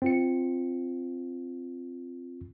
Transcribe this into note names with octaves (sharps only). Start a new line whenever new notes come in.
C4 F4 C#7